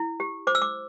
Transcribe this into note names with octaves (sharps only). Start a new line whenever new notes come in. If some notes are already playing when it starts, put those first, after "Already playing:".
Already playing: E4
G4
C5 D6
E6
D6